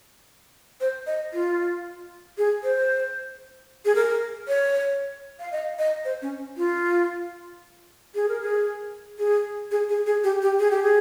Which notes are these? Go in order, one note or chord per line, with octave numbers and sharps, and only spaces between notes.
C5
D#5
F4
G#4
C5
G#4
A#4
C#5
F5
D#5
D#5
C5
C#4
F4
G#4
A#4
G#4
G#4
G#4
G#4
G#4
G4
G4
G#4
G4
G#4